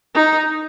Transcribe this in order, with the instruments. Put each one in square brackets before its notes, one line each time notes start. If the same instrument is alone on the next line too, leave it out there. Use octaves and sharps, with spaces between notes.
[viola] D#4